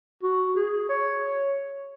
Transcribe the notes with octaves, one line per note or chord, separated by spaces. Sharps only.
F#4
G#4
C#5